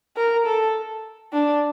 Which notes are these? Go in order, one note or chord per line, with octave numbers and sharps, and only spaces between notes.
A#4
A4
D4